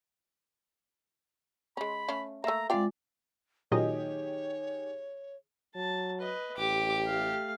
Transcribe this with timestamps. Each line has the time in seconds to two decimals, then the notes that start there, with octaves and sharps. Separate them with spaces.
1.77 G#3 C#4 B5
2.08 A3 C#4 F5
2.44 A3 A#3 E5 A#5 E6
2.70 G#3 C4 F4 D5 F5 G5
3.72 A#2 D#3 F#3 G4 G#4 C#5 D#5
5.75 F#3 A5
6.20 B4 D#5
6.57 A1 G4 D6
7.07 A3 F5